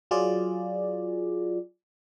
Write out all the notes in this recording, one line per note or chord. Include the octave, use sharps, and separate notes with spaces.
F#3 F4 G#4 D5